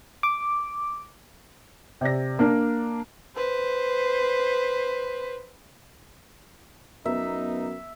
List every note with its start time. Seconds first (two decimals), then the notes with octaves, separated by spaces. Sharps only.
0.23 D6
2.01 C3 D5 A#6
2.39 A#3 D4 A#4
3.36 B4 C5
7.05 F#2 B3 D#4 E5 A#5